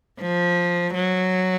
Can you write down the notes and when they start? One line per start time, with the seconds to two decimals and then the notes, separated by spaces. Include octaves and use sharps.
0.21 F3
0.94 F#3